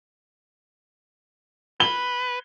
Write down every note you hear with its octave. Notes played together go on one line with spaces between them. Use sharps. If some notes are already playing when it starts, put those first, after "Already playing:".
B4 G7